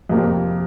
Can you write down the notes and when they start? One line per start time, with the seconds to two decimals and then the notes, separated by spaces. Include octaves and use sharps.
0.09 F2 C3 F3 A#3 G4